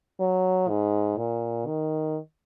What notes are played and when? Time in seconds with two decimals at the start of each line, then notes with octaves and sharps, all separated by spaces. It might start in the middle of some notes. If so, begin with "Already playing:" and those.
0.20 F#3
0.69 G#2
1.17 A#2
1.66 D#3